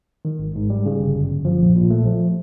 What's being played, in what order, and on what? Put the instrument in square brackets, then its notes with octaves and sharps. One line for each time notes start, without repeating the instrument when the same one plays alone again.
[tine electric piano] D#3
G#1
G#2
G3
C#3
G1
F#2
G1
F3
A#1
A#2
A3
F3